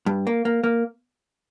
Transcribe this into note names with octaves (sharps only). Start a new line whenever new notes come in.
G2
A#3
A#3
A#3